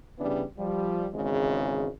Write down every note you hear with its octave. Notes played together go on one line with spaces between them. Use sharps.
C#3 E3 G3 B3 D4
F3 G3
G#1 E2 C#3 G#3